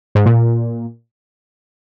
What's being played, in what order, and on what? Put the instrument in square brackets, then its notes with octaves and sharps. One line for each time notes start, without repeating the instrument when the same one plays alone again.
[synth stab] G#2
A#2